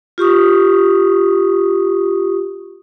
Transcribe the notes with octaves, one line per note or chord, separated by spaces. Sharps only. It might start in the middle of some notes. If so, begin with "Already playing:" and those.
F4 G4 C#6 D#6